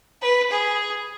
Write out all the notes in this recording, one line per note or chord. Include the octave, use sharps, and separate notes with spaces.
B4
G#4